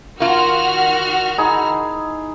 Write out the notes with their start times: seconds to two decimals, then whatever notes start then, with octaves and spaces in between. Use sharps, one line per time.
0.20 D#3 A#3 F4 F#4 F6
1.38 D#4 E4 G#4